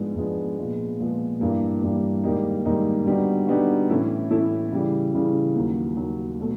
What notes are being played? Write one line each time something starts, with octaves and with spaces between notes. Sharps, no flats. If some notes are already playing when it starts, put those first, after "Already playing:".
Already playing: G#2 F3 G#3 B3 D4
G#2 F3 G#3 B3 D4
A#2 F3 G#3 B3
A#2 F3 G#3 B3
G2 E3 G3 A#3
G2 E3 G3 A#3
G#2 D#3 G3 A#3 D#4
G#2 D#3 G3 A#3 D#4
D3 G3 B3 D#4 F#4
D3 G3 B3 D#4 F#4
A2 E3 A3 C#4 E4
A2 E3 A3 C#4 E4
C#3 E3 G3
C#3 E3 G3
D#2 D#3 F#3
D#2 D#3 F#3
B2 F#3 A3